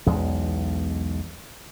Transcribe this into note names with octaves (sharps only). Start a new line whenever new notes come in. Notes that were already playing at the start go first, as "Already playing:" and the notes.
B1 E2 G#3